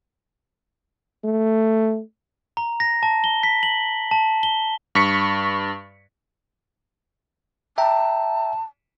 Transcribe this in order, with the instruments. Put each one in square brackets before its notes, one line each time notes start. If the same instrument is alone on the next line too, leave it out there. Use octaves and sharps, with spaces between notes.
[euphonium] A3
[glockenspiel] A#5
A#6
A5
G7
B6
F#7
A5
G7
[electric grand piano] G2 C#6 B6 C#7
[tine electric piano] E5 G5 A#5 [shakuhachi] A5